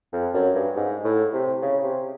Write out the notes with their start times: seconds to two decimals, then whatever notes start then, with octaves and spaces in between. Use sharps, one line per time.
0.13 F2
0.34 F#2
0.55 G2
0.76 G#2
1.04 A2
1.33 C3
1.62 C#3
1.83 C3